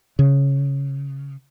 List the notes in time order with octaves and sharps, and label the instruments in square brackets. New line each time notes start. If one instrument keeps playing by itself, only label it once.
[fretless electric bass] C#3